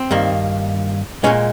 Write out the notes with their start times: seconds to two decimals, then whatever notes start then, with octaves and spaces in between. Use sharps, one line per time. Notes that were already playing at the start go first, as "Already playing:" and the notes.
Already playing: C4
0.11 G2 D#3 A#3
1.24 A#2 G#3 C#4